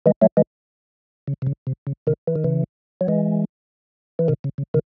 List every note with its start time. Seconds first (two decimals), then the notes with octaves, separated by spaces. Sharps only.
0.06 E3 G#3
0.22 F#3 A3
0.37 E3 G#3
1.28 C#3
1.42 C3
1.47 C#3
1.67 C3
1.87 C#3
2.07 C3 D#3
2.28 E3
2.36 D#3
2.44 C#3 E3
3.01 F#3
3.08 E3 G#3
4.19 E3
4.28 C3 D#3
4.44 C#3
4.58 C#3
4.74 C3 D#3